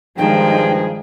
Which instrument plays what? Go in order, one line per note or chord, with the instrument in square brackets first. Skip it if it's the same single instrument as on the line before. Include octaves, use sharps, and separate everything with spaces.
[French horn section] G2 F3 [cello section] D#3 G#3 [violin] G#4 [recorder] G5